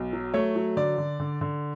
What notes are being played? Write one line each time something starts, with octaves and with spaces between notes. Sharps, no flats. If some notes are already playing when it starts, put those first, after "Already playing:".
Already playing: B1
F#3
A3 C#5
F#3
D3 D5
D3
D3
D3